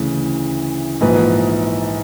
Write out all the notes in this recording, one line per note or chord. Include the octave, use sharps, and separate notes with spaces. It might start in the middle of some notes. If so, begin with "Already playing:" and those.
Already playing: D2 C#3 E3
A#1 G#2 E3 B4